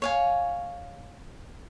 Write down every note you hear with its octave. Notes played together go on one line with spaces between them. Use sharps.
C#5 F5 G#5